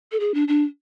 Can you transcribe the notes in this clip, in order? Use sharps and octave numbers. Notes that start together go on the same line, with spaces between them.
A4
G#4
D4
D4